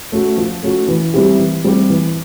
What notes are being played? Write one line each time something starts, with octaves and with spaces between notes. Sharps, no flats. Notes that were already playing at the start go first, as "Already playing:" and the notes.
A3 C#4 F#4
F3
A3 C#4 F#4
E3
G3 C4 E4 G4
E3
G3 C4 E4 G4
E3